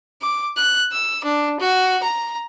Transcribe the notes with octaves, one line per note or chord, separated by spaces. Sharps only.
D6
F#6
E6
D4
F#4
A#5